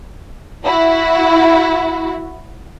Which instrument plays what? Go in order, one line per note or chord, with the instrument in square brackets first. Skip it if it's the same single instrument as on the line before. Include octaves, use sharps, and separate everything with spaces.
[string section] E4 F#4